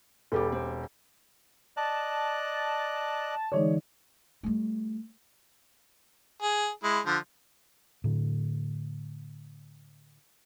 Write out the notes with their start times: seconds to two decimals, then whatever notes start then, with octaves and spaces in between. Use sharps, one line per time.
0.32 E1 G4 A4 B4 D6
0.52 C4
1.77 D5 D#5 A5 F#6
3.52 D3 E3 G#3 D#4 C#5 D5
4.43 G3 A3
6.42 G#4
6.83 G#3 E4
7.06 D3 F3
8.04 A2 D3